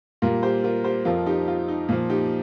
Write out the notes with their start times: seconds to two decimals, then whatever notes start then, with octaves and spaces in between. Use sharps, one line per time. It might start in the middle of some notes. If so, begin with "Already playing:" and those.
0.22 A#2 G3 F4 A#4
0.43 G4 C5
0.64 F4 A#4
0.84 G4 C5
1.05 F2 F3 F4 A#4
1.26 D#4 G4
1.48 F4
1.68 D#4
1.89 A#2 F3 F4
2.10 D#4 G4